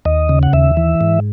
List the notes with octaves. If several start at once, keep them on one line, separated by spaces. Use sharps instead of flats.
D#2 D#5
C#3
F#5
D#2 E5
E3
G#2